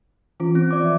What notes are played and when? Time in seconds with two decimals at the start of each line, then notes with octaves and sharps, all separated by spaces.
0.40 E3 C#4 F4
0.55 C4
0.71 D5 D6
0.83 E3 F3 E5